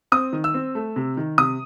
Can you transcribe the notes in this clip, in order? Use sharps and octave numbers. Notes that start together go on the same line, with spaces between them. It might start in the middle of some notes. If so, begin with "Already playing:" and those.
C4 D#6
D#3
E6
C4
A3
C3
D#3
C3 D#6